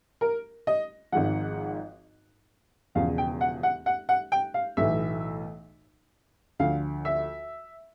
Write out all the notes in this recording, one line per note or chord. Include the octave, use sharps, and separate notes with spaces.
A#4
D#5
G#1 G#2 F3 F#5
E1 E2 C#3 F3 F5
G5
F#5
F#5
F#5
F#5
G5
F5
B1 A2 E3 E5
D2 D3 F3 F5
E5